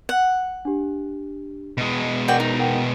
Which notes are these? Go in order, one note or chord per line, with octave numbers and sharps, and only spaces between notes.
F#5
D4 G4
B2 G#3
F#4 A#4 D5 G5
D#4
A#4 F#5 G5